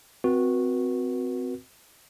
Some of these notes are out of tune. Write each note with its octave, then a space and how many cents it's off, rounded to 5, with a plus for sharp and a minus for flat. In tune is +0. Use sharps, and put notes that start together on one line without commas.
C4 -20 F#4 -15 B4 -40